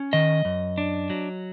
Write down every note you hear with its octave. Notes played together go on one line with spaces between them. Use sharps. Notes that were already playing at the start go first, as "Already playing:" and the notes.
Already playing: C#4
D#3 D#5
F#2
D4
F#3